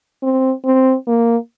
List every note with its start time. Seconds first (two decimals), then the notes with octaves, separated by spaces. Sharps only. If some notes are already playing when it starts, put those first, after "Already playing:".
0.23 C4
0.65 C4
1.07 A#3